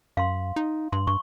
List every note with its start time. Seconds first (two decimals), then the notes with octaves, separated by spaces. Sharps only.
0.17 F#2 F5 C6
0.56 D#4
0.92 G2 C6
1.07 G2 C#6